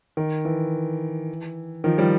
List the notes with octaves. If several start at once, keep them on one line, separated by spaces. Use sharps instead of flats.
D#3
E3
D#3 F3
F3 G3